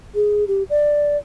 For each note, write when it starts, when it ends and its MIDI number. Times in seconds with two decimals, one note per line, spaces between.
0.15 0.44 68
0.48 0.63 67
0.70 1.17 74